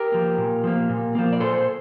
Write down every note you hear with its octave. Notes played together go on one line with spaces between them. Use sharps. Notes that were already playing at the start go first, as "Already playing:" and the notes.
Already playing: G4 A#4
F3 A#3
A#2
F3 A#3
A#2
F3 A#3
D5
A#2 A4 C5